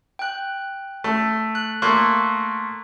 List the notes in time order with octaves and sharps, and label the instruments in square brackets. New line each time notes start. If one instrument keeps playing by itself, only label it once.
[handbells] G5 F#6
[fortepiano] A3
[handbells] F#6
[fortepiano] A3 A#3 [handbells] C6 C#6 F#6